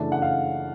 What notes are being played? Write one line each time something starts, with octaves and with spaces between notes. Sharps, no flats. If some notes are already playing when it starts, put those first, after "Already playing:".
Already playing: F#2 C#3 E3 A3 D4 A5
F#5
F5